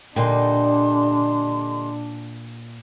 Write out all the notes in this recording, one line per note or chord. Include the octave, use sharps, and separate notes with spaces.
A#2 D3 G3 D4 D#4 G5 C6